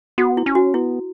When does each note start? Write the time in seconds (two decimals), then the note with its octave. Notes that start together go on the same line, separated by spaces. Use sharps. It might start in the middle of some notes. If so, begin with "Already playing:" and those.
0.18 B3 F#4
0.37 E4
0.46 C#4
0.55 F#4
0.74 B3 E4